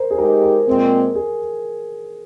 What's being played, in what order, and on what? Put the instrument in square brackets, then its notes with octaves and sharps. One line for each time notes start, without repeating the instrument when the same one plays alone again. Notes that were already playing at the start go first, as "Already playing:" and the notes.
Already playing: [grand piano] A#4 C5
G#4
[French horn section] G#3 D#4 G4 [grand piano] A#4
[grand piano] A#4
[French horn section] A#2 G#3 C4
[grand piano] G#4